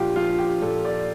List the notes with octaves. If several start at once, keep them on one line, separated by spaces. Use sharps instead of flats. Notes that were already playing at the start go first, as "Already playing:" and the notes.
Already playing: A#2 F3 F4 G4
F3 F4
G4
A#2 A4
D5